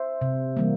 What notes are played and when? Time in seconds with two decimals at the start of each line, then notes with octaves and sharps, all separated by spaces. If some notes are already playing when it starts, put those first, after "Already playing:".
Already playing: C5 E5
0.21 C3
0.57 E3 G3 A#3